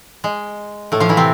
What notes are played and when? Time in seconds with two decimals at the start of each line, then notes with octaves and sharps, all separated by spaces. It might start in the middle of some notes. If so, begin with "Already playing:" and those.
0.24 G#3
0.92 A2 A3
1.00 F3 F4
1.09 E3 E4
1.17 C3 C4